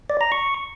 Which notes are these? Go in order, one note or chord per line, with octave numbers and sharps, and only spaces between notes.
D5
A#5
C#6